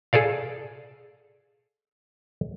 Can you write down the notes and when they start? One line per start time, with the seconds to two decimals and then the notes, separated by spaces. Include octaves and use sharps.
0.13 G#4 A4 D5 F5